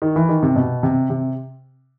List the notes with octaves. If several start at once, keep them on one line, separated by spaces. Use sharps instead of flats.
D#3
E3
D#3
C3
B2
C3
C3